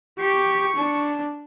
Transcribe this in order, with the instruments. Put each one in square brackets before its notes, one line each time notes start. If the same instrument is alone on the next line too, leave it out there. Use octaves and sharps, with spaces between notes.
[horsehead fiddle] G4 [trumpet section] C#6
[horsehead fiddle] D4